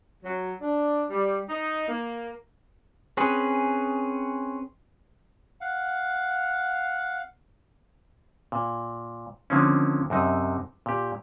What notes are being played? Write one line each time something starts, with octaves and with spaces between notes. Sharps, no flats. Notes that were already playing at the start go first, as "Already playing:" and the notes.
F#3
D4
G3
D#4
A#3
C4 C#4 G#4 B4
F5 F#5
A#2
D3 D#3 F3 A#3 C4 C#4
F#2 C3 D#4
A#2 G4